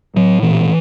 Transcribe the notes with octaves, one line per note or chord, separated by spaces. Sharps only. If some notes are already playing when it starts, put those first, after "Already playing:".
A2 F#3
A#2 E3